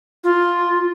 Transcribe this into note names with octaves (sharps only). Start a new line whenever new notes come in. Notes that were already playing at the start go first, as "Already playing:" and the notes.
F4